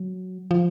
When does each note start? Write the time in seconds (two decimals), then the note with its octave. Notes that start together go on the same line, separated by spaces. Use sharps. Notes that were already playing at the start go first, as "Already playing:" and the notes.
Already playing: F#3
0.51 F3